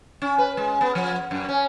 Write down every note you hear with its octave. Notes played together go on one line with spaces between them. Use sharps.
C#4
B4
G#3
B3
F3
F#2
C#4